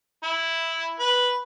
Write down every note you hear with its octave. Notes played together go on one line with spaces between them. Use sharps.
E4
B4